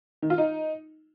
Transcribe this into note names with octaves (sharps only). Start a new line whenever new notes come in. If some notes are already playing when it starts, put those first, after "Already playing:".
D#3
F4
D#4